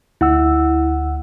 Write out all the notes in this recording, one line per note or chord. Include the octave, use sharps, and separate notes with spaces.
D2 E4 F#5 E6